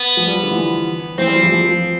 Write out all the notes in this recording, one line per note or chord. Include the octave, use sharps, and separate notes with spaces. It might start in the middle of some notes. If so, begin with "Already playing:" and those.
Already playing: B3
F3
G3
F3
D3
E3
E3 C4
G3
F3
E3
F3
F3